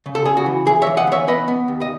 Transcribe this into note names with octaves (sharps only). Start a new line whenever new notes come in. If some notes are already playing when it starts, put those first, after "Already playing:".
C#3
A4
C#3 G#4
F#4
E3
E3 G#4
C#5 E5
E3
D#5 F#5
E3 C#5 E5
B3 B4 D#5
B3
D#2
D#5